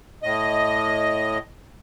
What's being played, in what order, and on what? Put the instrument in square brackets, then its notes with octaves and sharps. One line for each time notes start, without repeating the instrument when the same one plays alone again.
[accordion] A2 D#5